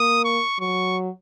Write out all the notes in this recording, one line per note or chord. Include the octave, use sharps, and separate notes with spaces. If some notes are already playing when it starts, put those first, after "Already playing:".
Already playing: A#3 D#6
C#6
F#3 C#6